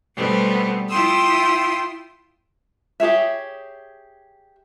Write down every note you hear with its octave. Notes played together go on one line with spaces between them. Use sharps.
B2 G3 A3 B3 C4
E4 F4 G5 C6 D#6 E6
G4 G#4 C#5 E5